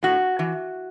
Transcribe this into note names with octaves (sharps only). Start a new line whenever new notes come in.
A2 F#4
E3